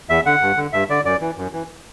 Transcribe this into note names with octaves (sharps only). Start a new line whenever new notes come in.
E2 E5
D3 F#5
G2
D3
G2 E5
D3 D5
F#2 D5
E3
F#2
E3